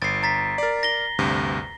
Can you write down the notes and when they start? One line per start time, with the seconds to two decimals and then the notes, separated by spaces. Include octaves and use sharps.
0.02 G1 A6 C7
0.23 A#5 A6 B6
0.58 A#4 D5
0.83 A#6 G7
1.19 D2 G2 C3